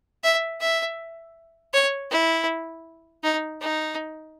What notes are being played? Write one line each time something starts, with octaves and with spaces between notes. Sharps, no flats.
E5
E5
C#5
E4
D#4
D#4